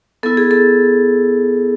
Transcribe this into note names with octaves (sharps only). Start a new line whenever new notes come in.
B3 E4 A4
G#4
A4